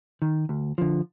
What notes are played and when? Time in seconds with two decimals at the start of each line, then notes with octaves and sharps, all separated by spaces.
0.22 D#3
0.49 D2
0.78 D3 F3